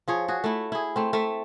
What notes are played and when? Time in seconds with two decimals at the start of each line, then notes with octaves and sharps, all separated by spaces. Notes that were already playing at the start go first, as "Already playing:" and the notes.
0.08 F3 G#4 C#5
0.28 F#4 G#4
0.44 A3 E4
0.72 E4 G#4
0.96 A3 C4
1.13 A3 E5